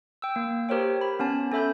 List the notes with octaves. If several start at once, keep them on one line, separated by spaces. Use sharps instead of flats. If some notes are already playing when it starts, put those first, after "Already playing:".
G5 E6
A#3
G4 A#4 C5 C#5 G5
B5
B3 C#4 A5
C#4 A4 E5 B5 G6